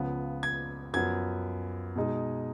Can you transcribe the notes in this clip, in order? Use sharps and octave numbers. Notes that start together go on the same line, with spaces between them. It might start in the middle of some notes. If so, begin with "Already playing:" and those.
Already playing: C#2 C#3 F3 B3
G#6
F#2 F3 B3 G#6
B2 G#3 D#4